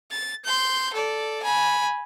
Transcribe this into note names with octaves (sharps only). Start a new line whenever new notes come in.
A6
C6 G6
A4 D5
G#5 B5